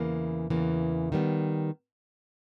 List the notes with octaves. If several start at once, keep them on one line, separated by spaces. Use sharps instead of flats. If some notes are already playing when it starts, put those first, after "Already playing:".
Already playing: E2 C#3 E3 A#3
E2 C#3 E3 A#3
D#3 G3 B3